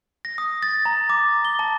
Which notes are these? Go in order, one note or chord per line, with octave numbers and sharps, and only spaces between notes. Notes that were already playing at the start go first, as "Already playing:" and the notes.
A#6
D#6
A6
A#5
D6
G7
A5